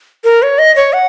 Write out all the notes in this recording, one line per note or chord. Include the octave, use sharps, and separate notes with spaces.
A#4
C#5
D#5
C#5
F#5